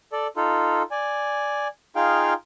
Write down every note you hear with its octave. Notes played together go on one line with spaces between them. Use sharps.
A4 D5
D#4 F4 A4
D5 G#5
D#4 F4 G#4 F5 G5